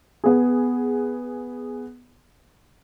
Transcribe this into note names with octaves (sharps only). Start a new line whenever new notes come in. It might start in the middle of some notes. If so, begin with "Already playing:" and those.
B3 G#4